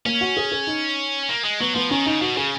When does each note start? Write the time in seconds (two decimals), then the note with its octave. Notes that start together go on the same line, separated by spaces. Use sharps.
0.06 A#3 C#4
0.21 F#4
0.37 G#4
0.52 G#4
0.67 D#4
1.29 A#3
1.44 G#3
1.60 F#3 B3
1.75 F3 B3
1.91 D#3 C#4
2.06 C#3 D#4
2.21 B2 F#4
2.37 C#3 G#4